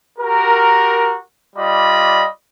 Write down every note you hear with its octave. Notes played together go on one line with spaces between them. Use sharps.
F#4 G4 A#4
G3 F4 D5 D#5 B5